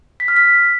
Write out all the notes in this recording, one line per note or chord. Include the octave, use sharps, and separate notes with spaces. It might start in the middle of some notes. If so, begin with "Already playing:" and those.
B6
F6
B6